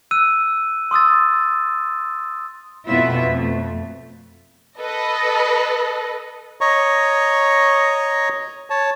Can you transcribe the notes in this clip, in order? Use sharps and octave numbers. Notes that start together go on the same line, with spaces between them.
E6 F#6 D#7
C6 D#6 E6 A6
F2 B2 E4 F4 E5
F2 A3
A4 B4 D#5
C#5 D#5 A#5 C#6
C#5 A5